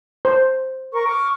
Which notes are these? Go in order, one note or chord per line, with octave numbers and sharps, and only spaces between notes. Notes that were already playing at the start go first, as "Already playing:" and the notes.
C5
A#4 C#6
C#6 D6 F6